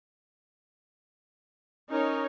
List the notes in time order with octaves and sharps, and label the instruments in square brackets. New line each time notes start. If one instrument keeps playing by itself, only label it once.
[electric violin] C#4 A#4 [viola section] D#4 C#5